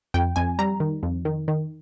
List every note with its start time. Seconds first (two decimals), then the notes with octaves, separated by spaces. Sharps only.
0.14 F2 G5
0.36 F2 G#5
0.59 G3 A#5
0.80 D#3
1.03 F2
1.25 D#3
1.48 D#3